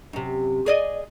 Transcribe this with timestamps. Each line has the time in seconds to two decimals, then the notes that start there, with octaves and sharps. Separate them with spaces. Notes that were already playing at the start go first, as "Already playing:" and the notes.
0.13 F#2 C3
0.66 G#4 D5 D#5